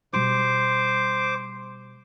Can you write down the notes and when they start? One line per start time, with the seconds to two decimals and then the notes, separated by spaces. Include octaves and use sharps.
0.13 B2 G3 C5 D6